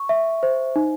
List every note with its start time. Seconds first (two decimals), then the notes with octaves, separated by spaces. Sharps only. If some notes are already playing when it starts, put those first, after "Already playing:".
Already playing: C#6
0.09 E5
0.43 C5
0.76 D#4